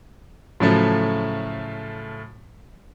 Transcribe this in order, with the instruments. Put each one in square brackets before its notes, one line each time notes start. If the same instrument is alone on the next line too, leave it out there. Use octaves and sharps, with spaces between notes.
[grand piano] A2 C#3 F3 F#3 A3